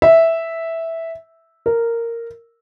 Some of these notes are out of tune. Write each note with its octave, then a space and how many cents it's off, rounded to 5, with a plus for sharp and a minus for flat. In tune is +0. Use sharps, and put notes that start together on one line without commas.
E5 -5
A#4 -10